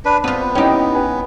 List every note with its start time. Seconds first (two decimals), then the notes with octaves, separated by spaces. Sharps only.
0.05 D4 B4
0.24 B3 C4 F4 B4
0.55 C#4 D#4 E4 G4 G5
0.95 B4 G#5